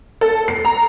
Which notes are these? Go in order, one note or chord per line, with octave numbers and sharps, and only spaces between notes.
A4
C7
A#5